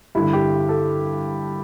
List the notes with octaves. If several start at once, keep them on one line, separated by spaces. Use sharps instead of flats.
G2 D3 E4
G4
A4